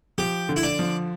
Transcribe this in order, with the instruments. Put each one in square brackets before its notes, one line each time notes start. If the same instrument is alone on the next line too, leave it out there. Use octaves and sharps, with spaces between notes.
[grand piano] F3 [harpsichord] G4
[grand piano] D3
[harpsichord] E4
D4
[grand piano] F3